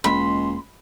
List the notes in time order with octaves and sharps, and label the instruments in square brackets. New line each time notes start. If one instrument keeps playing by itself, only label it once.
[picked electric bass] E1 G#3 A#3 [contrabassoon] C#2 [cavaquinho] B5 [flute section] C6